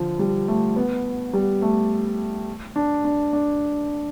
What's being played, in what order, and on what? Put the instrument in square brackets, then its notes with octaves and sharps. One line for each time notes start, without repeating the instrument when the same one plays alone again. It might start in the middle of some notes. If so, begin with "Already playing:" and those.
Already playing: [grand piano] D3 F3
G3
A3
B3
G3
A3
D4
D4
D4